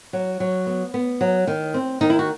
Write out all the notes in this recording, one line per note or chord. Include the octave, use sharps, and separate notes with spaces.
F#3
F#3
B3
B3
F#3
D#3
C4
D#3 D#4
E4
F#4